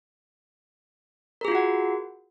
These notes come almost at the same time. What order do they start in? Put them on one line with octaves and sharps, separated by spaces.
A#4 G#4 F4 F#4 F#5